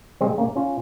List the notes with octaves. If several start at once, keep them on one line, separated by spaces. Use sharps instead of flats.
G#3 C4
A#3 C#4
C#4 F4